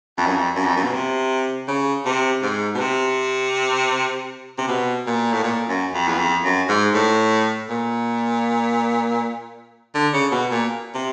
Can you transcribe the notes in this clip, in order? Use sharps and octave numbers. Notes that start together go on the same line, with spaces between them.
F2
F#2
F2
F#2
F2
F#2
B2
C3
C#3
C3
G#2
B2
C3
C3
B2
A#2
A2
A#2
F#2
F2
E2
F2
F#2
G#2
A2
A#2
D3
C#3
B2
A#2
C3